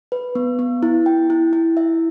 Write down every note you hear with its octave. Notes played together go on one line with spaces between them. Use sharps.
B4
B3
B3
E4
G5
E4
E4
E5